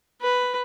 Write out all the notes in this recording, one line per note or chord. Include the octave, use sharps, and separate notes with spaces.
B4